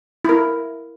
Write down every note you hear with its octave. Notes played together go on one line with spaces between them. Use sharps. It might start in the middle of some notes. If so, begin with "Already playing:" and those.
E4 A#4